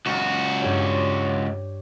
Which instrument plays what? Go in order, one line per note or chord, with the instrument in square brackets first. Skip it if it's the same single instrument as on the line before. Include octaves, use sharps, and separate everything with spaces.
[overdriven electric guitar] C#2 F#4
[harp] G2 G4 C#5